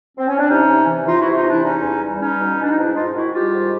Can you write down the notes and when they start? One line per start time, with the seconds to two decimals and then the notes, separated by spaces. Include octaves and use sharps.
0.17 C4
0.28 C#4
0.39 D4
0.49 C3 C#4 D#4
0.68 C3
0.87 E3
1.06 E3 D#4 F4
1.20 E4 F#4
1.26 C3
1.35 D#4 F4
1.45 E3 D4 E4
1.63 E2 C#4 D#4
1.82 E2
2.02 G3
2.20 G3 C#4 D#4
2.39 B2
2.58 B2 D4
2.70 D#4
2.77 G#2 D4 E4
2.95 G#2 D#4 F4
3.14 D#3 E4 F#4
3.34 G3 F4 G4
3.53 G#2